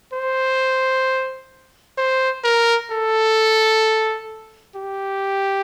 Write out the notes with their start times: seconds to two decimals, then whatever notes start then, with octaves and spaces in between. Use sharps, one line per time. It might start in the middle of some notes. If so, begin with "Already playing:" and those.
0.14 C5
1.98 C5
2.44 A#4
2.91 A4
4.75 G4